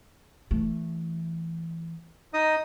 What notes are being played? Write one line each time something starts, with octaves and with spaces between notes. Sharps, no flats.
E3 A3
D#4 D#5 D#6